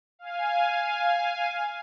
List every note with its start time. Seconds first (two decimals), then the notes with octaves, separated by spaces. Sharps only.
0.19 F5 G#5